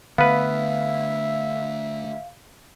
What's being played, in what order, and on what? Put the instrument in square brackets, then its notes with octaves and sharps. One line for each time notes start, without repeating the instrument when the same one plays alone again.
[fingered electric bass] D3 A3 [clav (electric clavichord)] B3 B4 [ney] E5 [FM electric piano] F5